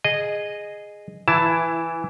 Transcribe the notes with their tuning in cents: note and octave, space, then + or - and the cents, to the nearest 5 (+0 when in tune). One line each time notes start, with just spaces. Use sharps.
G#4 +0 D#5 -15
E3 +0 E4 +20 A5 +0